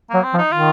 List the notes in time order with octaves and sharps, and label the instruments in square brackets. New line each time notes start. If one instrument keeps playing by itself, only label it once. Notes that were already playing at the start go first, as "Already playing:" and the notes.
[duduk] F#3 [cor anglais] A#3
[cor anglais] C4
[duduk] F3
[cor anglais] D#4
[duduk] D#3 [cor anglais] F4